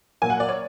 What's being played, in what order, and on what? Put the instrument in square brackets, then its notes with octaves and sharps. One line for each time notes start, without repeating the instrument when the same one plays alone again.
[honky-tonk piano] A#2 F#3 A#3 G#5
F#5
D5
C#5